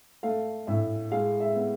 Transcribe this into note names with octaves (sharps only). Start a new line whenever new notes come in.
A3 F5
A2 E5
G#3 F5
E5
B3